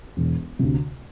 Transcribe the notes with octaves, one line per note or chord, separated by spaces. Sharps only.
E1
D2 C3